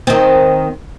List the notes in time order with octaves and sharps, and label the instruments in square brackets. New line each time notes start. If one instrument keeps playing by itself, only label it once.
[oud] D#3 C4